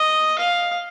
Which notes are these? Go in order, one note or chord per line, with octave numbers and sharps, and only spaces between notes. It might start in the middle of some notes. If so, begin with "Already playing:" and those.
Already playing: D#5
F5